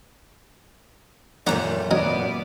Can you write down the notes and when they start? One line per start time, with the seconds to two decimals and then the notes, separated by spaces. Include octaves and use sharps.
1.47 F#2 A#2 G3 A3 D5 F#5 A#5
1.91 F#3 B3 D#4 D5